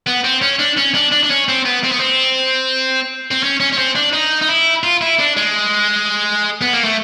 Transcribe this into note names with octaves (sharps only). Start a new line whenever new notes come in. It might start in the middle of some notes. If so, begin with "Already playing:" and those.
B3
C4
C#4
D4
C#4
D4
D4
D4
C#4
C4
B3
C4
B3
C4
C4
C#4
C#4
C#4
C4
D4
D#4
D#4
E4
F4
E4
D4
G#3
B3
A#3
A3